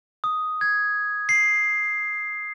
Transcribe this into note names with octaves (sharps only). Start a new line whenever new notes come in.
D#6
G#6
C7